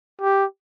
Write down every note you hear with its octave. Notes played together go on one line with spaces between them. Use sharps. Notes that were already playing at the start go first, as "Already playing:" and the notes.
G4